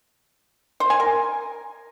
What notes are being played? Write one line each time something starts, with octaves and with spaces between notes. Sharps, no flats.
C5
G#5
A#4